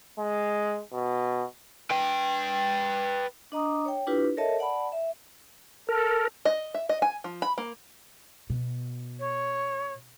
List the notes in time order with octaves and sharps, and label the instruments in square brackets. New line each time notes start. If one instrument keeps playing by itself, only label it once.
[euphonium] G#3
B2
[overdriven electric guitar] B4 G5
[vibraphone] D4 D#5 A#5 D6 D#6
C#5 G5
D4 E4 F4 G4 B4
A4 A#4 C#5 D#5 E5 A5
D5 F#5 A5 B5
E5
[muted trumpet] A4 [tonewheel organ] A#4
[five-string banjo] D#5
E5
D#5
G#5
F3
B5
A#3
[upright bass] B2
[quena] C#5